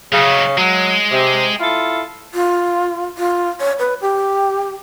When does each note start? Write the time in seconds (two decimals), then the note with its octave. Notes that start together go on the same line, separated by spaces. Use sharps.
0.13 C#3 F#3 D#4
0.58 F#3 G#3
1.11 C3
1.60 E4 F4 A4
2.34 F4
3.18 F4
3.60 C#5
3.79 B4
4.01 G4